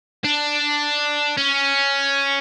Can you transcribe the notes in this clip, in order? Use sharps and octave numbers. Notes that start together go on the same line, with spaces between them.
D4
C#4